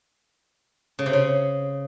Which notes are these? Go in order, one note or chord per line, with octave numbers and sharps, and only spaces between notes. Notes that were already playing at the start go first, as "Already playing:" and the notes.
C#3
C3
C#3